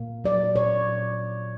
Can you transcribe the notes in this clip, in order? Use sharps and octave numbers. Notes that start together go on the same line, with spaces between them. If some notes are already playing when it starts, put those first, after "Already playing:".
Already playing: A#2 A#3
F#3 D5
A#2 C#5